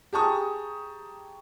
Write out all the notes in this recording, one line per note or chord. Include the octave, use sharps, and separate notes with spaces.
G4 G#4 A5 A#5 C#6 D#6